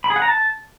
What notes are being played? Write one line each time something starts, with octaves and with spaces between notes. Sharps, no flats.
B5
G#4
F#5
A#5
A5